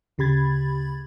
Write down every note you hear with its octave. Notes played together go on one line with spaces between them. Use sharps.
D2 C#3 G4 B5 G#6 A6